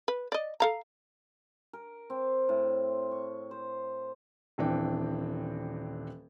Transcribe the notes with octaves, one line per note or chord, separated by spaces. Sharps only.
B4
D5 D#5
A4 F5 A#5
A#4
C4
A2
C#6
C5
D#1 E3 C4 D4 G5